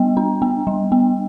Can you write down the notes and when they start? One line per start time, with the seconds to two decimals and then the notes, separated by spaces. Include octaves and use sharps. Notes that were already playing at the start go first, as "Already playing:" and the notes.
Already playing: G3 B3
0.17 D4
0.42 B3
0.67 G3
0.92 B3